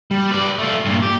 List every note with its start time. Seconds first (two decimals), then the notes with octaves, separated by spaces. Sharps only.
0.11 G3
0.31 B4 D5
0.58 A3 F4
0.85 G2 A#2
1.02 G4